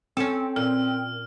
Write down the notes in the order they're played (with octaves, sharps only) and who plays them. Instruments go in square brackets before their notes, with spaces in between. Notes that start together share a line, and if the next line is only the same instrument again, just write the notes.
[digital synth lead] C4 [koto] C#4 A4
[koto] A#2 [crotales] F6